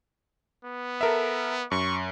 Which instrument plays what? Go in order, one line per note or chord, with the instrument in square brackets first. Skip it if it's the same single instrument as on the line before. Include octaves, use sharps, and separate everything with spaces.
[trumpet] B3
[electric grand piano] A4 A#4 E5
[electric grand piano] F#2 [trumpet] C#6